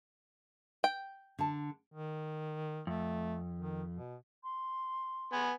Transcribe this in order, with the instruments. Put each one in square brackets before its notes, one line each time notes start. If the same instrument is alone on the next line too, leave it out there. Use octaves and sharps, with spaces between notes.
[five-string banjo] G5
[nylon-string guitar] D3 A5
[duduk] D#3
[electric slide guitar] F2 [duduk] A3
[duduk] D#3
B2
[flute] C6
[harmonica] B3 G#5